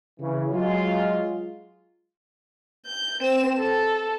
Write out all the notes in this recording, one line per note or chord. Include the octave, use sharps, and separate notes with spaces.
C#3 E3
F#3 G#3 F4
G6
C4 E7
A4